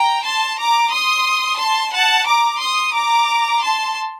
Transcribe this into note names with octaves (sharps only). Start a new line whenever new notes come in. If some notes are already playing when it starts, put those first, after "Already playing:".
Already playing: G5 A#5
A5 C6
A#5 D6
C6 D#6
A5 C6
F#5 A5
A#5 D6
C6 D#6
A#5 D6
A5 C6